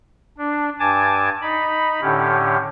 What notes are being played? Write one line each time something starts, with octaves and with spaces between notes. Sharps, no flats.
D4
G2 G#5 A5 D6
D#4 B5
A2 D3 C#4 G4